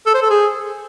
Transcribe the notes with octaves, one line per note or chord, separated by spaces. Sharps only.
A4
C5
A4
G#4